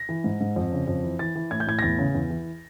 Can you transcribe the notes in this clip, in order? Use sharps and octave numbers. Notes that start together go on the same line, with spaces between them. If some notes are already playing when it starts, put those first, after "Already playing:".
Already playing: A#6
E3
G#2
G#2
F2
C#3
F2
E3
E3 A6
E3
A2 G#6
G6
A2 G#6
A#6
E2 A6
C#3
E2
E3